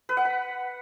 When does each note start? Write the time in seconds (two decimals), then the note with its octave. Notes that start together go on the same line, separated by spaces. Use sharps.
0.09 B4
0.17 F#5
0.25 B5